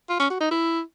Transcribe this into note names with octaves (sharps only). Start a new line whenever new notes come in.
F4
C#4
F#4
D#4
E4